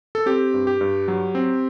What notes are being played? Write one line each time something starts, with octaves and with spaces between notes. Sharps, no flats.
A4
C4 G4
G2
G4
G2
F#3
C4